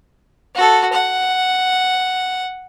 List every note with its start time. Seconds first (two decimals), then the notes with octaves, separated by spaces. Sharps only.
0.55 F#4 A4
0.93 F#5